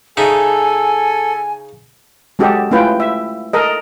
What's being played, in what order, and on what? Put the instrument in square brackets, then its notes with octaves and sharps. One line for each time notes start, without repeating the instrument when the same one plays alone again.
[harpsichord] C#3 D#4 E5 [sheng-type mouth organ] A4 [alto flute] G#5
[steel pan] G#3 C#4 F#4 G4 A4 D#5
A3 C#4 E4 F4 B4 G5
E5
A4 A#4 D#5